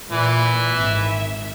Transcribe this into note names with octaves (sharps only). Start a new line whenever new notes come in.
A#2 E3
G#1 E5